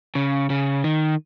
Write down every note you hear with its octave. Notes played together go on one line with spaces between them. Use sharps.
C#3
C#3
D#3